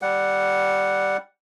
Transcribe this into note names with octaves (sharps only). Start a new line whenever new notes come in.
G3 F#5